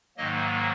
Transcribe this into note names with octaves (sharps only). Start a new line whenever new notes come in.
G#2 D#3 F#3 A#3 D#5